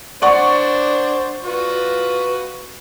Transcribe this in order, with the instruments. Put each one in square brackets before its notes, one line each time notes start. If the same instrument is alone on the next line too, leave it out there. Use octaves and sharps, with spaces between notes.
[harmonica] D4 C5 [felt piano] D5 F#5 C#6
[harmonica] F4 F#4 B4